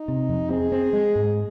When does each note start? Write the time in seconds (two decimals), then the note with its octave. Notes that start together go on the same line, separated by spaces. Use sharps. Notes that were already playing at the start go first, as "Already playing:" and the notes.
Already playing: D#4
0.08 C3
0.29 F2
0.50 C4 G#4
0.72 C4
0.93 G#3
1.16 G#2